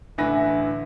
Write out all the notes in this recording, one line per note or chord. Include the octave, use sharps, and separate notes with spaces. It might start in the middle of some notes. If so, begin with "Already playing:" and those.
A1 D3 B4 E5 G#5 A#6